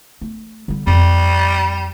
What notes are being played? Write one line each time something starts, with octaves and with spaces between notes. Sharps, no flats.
A3
D3 G3
F2 G3